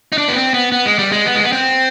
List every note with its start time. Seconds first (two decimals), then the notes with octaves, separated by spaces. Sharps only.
0.12 D#4
0.18 D4
0.28 B3
0.35 C4
0.54 B3
0.72 B3
0.85 G#3
0.99 G3
1.12 G#3
1.26 B3
1.35 G#3
1.44 B3
1.52 C4